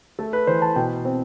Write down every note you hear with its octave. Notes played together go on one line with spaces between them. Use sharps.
A3 A4
B4
E3 C5
A5
B2 G5
C4